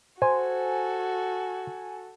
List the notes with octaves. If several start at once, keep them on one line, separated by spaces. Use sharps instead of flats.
F#4 A4 C5 G#5